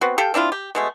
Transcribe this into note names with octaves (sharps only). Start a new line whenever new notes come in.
B3 C4 F#4
G4 A4 F5 G5
C4 D4 E4 F4
G4
B2 G#3 A3